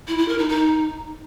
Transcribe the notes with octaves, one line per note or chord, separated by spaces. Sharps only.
E4
E4
A#4
D#4
D#4